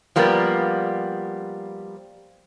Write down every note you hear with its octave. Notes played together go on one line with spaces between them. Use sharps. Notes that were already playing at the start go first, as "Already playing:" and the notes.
F3 G3 A#3 B3